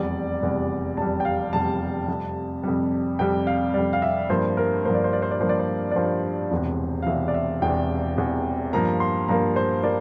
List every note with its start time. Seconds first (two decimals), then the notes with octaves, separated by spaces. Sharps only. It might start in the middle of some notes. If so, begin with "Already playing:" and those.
Already playing: F1 E2 C3 G3 D5
0.41 F1 E2 C3 G3
0.97 F1 E2 C3 G3 A5
1.20 G5
1.25 F5
1.53 F1 E2 C3 G3 A5
2.08 F2 C3 G3
2.63 F2 C3 G3
3.19 F2 C3 G3 G5
3.47 F5
3.74 F2 C3 G3 D5
3.93 F5
4.02 E5
4.30 G2 F3 A#3 C5
4.57 A#4
4.85 G2 F3 A#3 C5
4.95 D5
5.04 C5
5.13 D5
5.22 C5
5.31 D5
5.40 G2 F3 A#3 C5
5.49 D5
5.59 C5
5.91 D5
5.96 G2 F3 A#3 C5
6.52 E1 E2 C3
7.02 F5
7.07 E1 E2 C3 E5
7.28 D5
7.34 E5
7.62 E1 E2 C3 G5
8.18 E1 E2 C3
8.73 G2 F3 A#3 A#5
9.00 C6
9.28 G2 F3 A#3 A#5
9.56 C5
9.83 A#3 D5